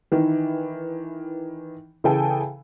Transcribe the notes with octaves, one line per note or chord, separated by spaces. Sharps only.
D#3 E3
C#3 E3 G#4 A4 G5 G#5